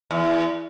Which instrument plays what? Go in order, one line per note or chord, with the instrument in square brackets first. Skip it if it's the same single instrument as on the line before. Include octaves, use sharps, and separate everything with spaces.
[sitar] E2